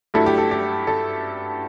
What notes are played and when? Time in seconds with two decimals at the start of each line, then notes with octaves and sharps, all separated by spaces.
0.14 G2 F#3 A3 E4 A4
0.26 G4
0.38 A4
0.51 G4
0.87 A4